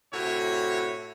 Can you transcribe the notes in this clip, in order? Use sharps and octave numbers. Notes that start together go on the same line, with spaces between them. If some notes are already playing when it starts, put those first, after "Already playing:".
A2 C3 E4 F#4 C#5